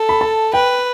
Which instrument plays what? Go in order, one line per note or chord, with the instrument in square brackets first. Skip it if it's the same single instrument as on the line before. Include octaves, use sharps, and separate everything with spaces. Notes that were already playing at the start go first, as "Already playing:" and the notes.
Already playing: [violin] A4
[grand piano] B5
A5
[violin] B4 [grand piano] G5